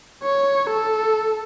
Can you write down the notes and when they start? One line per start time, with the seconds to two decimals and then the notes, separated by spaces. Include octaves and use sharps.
0.23 C#5
0.70 A4